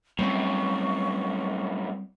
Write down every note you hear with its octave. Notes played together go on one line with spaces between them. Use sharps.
F#2 A2 G3 A#3 C4 C#6